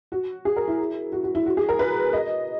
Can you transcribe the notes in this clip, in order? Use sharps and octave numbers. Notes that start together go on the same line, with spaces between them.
F#4
G#4
A#4
E4
F#4
F#4
E4
F#4
G#4
A#4
B4
D#5